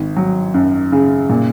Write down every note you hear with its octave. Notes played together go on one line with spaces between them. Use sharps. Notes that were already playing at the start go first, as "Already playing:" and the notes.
Already playing: G#1
F#3
F#2
C#3
A#2